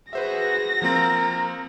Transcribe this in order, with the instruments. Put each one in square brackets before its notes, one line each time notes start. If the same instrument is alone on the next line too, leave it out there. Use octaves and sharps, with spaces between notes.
[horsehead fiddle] F#4 G#4 [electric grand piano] B4 C5 E5 [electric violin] A#6
[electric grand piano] F3 A#3 C4 [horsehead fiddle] A#4